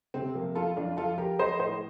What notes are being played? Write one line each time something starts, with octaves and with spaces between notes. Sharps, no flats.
C3 C4
F3 A#3
F2 F4 A4
F2 D4 F4
F3 F4 A4
F3 G4 A#4
F3 C5 D#5
A2 C5 D#5